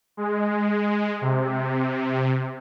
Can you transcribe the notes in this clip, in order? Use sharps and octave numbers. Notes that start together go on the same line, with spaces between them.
G#3
C3